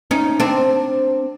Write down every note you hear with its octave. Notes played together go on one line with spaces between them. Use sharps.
C#4 D#4
C4 D4